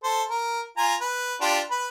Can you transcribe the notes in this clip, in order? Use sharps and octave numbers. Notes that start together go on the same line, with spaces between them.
A4 C5
A#4
F4 G#5 A#5
B4
D4 F4 G4
B4 B5